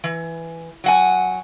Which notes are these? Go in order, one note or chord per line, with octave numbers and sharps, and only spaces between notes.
E3
F#3 F#5 G#5